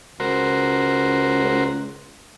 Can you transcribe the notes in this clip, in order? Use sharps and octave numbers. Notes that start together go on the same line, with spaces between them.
C#2 F#4 A#4 C5